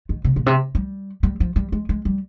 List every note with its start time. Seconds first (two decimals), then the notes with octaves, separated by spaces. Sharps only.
0.09 D#3
0.24 C3
0.36 A#2
0.46 C3
0.75 G3
1.23 G3
1.40 F3
1.56 G3
1.72 G#3
1.89 G#3
2.05 G3